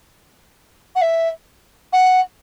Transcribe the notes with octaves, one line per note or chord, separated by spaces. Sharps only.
F#5
E5
F#5